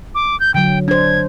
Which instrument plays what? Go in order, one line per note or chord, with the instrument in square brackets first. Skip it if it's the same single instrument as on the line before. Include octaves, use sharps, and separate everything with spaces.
[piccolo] D6
G6
[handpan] D3 F#3 [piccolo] G5
[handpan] D4 C5 [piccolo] G#6